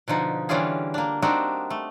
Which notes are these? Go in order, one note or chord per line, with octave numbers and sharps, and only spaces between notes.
B2 D3 F3 D#4
D3 E3 G3 C#4 F4 G#4
A#3 D4
G3 A#3 C4 D4 D#4 F#4
A3